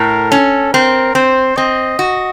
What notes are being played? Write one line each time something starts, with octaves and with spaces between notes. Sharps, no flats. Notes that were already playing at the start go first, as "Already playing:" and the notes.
Already playing: A2 A#4
C#4 A4
C4 A#4
C4 C5
C4 D#5
F#4